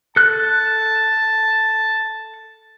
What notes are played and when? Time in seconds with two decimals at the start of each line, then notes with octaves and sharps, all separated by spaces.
0.16 A4 A5 F#6